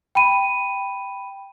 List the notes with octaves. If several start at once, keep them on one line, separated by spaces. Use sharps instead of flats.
G5 B5 D#7